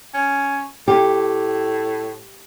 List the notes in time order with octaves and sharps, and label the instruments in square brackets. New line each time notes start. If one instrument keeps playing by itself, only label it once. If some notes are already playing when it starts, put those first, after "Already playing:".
[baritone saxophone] C#4
[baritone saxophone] A2 [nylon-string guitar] G4